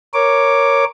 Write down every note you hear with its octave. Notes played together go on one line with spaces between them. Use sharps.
A#4 C#5 D6